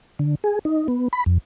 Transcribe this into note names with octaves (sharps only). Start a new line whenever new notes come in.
D3
G#4
D#4
B3
B5
F2